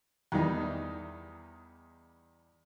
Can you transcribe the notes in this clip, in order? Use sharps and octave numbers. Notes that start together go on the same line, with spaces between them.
E2 D#3 G3 D#4